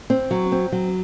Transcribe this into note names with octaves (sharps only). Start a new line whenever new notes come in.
C4
F#3
C4
F#3